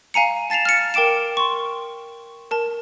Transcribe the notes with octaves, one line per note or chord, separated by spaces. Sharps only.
F5 G#5 A#5 C#7
A5 A6 C7 E7 F7
F6 A6 C#7
A#4 G5 D6 D7 E7
C6 C#6
A#4 A5